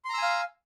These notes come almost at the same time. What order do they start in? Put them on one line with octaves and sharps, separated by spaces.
C6 A#5 E6 G#5 F5